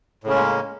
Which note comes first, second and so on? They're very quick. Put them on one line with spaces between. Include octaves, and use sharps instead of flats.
A2 C#3 C#4 G#3 A#3